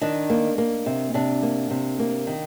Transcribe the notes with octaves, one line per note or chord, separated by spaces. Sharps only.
D#3 D4
A#3
A#3
C3
C3 D4
A#3
C3
A#3
D#3